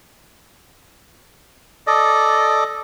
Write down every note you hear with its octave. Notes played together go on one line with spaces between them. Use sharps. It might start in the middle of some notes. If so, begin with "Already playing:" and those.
A4 D5 D#5